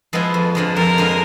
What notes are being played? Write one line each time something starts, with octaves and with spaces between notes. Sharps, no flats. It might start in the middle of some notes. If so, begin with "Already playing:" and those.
F3 G#3 B3 E4
F2
D3 F3 G#3
F2 A#4
D3 F3 G#3